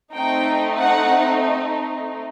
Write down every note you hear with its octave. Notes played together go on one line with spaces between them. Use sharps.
A3 C4 D#4 G5
F#5